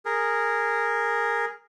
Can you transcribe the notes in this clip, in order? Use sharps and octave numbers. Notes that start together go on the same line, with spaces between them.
G#4 A#4